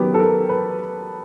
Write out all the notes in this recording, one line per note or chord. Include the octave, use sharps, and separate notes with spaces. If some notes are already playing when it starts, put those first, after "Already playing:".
Already playing: D#3 F#3 B3 G4
A4
A#4
B4